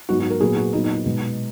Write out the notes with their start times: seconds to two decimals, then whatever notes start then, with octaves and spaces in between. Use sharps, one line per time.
0.09 G#2 F#3 B3 F#4
0.20 F#4
0.30 A#4
0.41 A#2 F#3 B3 G#4
0.57 F#4
0.73 A#2 F#3 B3 D#4
0.84 D#4
0.94 D#4
1.05 B2 G#3 B3